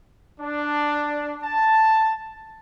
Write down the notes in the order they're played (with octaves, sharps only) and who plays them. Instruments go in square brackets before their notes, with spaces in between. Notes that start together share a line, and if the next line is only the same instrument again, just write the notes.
[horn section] D4
A5